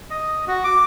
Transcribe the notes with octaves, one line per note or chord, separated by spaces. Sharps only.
D#5
F#4
D6